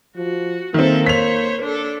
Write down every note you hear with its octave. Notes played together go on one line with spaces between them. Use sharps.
F3 F#4
D#3 A#3 C4 A4 E5
C5 C#5 B6 F7
D4 A4